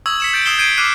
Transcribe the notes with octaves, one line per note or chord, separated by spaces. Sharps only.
C#6 D#6 E6 G#6 F#7
B6 C#7 E7
G6 A6 D7
D#6 E6 G#6 C7 E7 G7
G6 G#6 C7 D7 D#7
D6 F6 F#6 C7 D#7